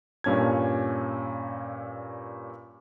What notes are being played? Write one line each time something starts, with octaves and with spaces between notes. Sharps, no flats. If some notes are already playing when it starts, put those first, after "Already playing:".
G2 A#2 C#4 A5 G#6